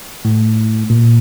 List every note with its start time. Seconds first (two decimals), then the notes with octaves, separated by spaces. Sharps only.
0.25 A2
0.90 A#2